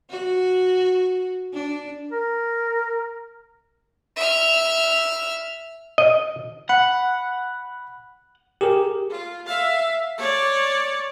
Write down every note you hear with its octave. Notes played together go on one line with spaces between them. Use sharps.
F#4
D4
A#4
E5 F6
D#5
F#5 B5
G4 G#4 A#4
F4
E5 F5
C#5 D5